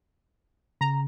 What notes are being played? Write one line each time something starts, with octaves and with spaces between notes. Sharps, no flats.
C#3 A#5